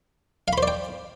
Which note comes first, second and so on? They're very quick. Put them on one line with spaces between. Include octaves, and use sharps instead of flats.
F5 B5 C5 D5 G5